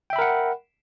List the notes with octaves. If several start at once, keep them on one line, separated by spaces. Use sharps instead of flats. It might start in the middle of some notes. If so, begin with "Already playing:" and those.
A#4 E5 F#5 G5 B5